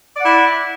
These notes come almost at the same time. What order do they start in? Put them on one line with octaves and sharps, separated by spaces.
D5 F#5 E4